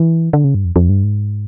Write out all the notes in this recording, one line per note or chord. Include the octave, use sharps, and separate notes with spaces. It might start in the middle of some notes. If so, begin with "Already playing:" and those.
Already playing: E3
D3
C#3
G2
F2
F2
G2
G#2